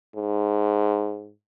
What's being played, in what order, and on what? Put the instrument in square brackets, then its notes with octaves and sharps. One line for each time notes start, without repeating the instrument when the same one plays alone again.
[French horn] G#2